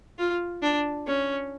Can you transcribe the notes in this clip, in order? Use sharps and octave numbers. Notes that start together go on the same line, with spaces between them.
F4
D4
C#4